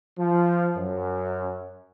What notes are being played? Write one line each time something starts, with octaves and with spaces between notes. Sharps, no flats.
F3
F#2